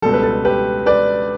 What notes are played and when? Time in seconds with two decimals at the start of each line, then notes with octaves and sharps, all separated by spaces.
0.02 C#2 B2 G3 A4
0.13 B4
0.23 A4
0.45 G4 B4
0.86 B4 D5